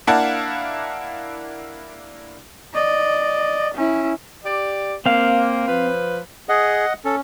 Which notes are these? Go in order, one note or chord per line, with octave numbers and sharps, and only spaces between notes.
A#3 D4 E4 F5 F#5 A5
D5 D#5
C#4 E4
G4 D5
A#3 C4 F5
F3 B4
G#4 D#5 F#5
C#4 A4